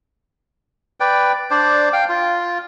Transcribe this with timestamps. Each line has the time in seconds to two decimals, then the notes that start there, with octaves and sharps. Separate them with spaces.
1.00 B4 D5 G5
1.51 D4 C5 D5
1.93 F5 G5
2.09 F4